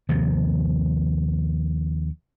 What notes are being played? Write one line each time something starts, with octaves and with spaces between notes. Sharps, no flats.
D#2 C3 F3